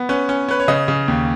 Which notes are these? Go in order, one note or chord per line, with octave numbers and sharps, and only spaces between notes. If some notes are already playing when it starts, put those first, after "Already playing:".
Already playing: B3
C#4 B4
C#4
C#4 B4
C#5
C#3 D#5
C#3
D#2